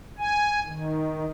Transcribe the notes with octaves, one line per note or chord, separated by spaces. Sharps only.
G#5
D#3